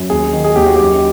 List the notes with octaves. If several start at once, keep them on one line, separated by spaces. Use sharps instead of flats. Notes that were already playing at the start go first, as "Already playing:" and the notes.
Already playing: F#2
D#2 G#4
D#3
G#4
D#2 G4
F#4
F#2 G4